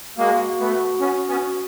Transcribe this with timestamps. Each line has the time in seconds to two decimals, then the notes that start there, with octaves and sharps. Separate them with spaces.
0.18 G#3 A#3 F#4
0.59 A3 B3
1.00 B3 C#4
1.28 B3 C#4